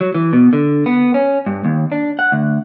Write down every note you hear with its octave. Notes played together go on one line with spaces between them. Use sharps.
F#3
E3
B2
D3
B3
C#4
G2
D#2
D4
F#5
D2